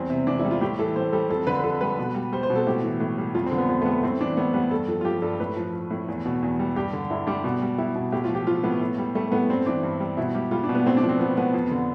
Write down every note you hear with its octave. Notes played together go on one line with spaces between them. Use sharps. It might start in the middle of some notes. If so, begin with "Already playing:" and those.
Already playing: E2 G3 C4
C3
E2 D4
E4
G3
F4
A2 G4
E3 A4
A2 C5
G3 A4
F2 A4
D3 B4
B4
F2 A4
G3 B4
B2
G3
G3 C5
C5
B2
A4
A2 G4
E3
A2
G3
F2 F4
C4
D3
B3
F2 B3
A3
G3 B3
A2 C4
E3 D4
A2 B3
G3 B3
G2 A4
F3 A4
F4
F3 G4
G2 A4
A2 B4
F3
F3
A2
E2
B2
E2
G3
G2 G4
D3
G2 E4
G3 D4
B2
G3
G3 E4
B2
A2 G4
F4
F3
G4
F3 F4
A2 B3
A2
G3
G3 A3
A3
A2 B3
G2 C4
E3 D4
G2
G3
B2 E4
G3 G4
G3 F4
D4
B2
B3
A2 C4
D4
F3
C4
F3 B3
A2 B3
F2
D3